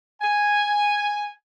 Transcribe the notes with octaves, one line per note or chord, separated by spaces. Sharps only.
G#5